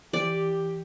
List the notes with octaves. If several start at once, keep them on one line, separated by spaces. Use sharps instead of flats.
E3 G4 D5